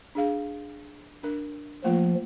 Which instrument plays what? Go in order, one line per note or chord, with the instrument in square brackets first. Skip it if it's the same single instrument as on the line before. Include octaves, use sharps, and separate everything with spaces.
[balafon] D4 G#4 F5
D4 A#4
[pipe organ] F3 [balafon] A3 A#3 F4